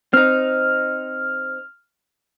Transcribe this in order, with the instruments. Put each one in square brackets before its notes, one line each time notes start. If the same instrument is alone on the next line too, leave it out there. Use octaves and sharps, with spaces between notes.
[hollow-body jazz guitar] C4 D#4 [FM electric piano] F6